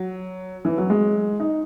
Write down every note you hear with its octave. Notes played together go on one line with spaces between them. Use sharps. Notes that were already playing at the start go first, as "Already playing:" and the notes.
Already playing: F#3
E3
F#3
G#3
D#4